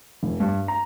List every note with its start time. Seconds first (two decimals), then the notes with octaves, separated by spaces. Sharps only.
0.23 F1
0.40 G2
0.68 A#5